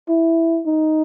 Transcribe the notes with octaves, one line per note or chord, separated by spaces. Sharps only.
E4
D#4